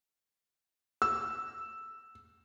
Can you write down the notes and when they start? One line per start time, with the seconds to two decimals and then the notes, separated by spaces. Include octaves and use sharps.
1.02 E6